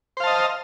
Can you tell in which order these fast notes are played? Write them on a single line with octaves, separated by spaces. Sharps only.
C5 F5 A5 D#5